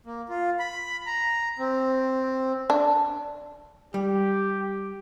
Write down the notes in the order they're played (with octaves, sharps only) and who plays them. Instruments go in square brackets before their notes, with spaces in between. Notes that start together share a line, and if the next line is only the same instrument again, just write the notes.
[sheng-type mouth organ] A#3
F4
B5
A#5
C4
[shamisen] D4
[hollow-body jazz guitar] G3 [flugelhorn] G4